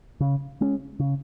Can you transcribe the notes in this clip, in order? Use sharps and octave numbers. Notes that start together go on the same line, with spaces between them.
C#3
G#3 C#4
C#3